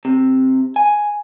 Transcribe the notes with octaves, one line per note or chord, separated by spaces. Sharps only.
C3
G#5